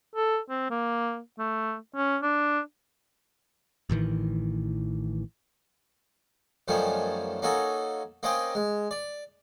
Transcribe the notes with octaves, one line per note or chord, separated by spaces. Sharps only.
A4
C4
A#3
A3
C#4
D4
A1 A2 D#3 E3
F#2 D#3 F3 G3 A3 C#4
A#3 C#4 D#4 F#4 A4
A#3 C4 C#4 D#5 G5
G#3
D5